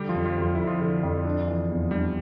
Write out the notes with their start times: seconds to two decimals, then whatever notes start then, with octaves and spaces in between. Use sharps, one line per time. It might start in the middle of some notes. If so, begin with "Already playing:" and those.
Already playing: D3 G3 G4
0.09 F3 F4
0.14 F2
0.25 F3 F4
0.37 F2 F4
0.55 F2 E4
0.67 F3 F4
0.81 D3
1.03 F2
1.25 D4
1.47 E3
1.70 E2
1.91 G3 D4 G4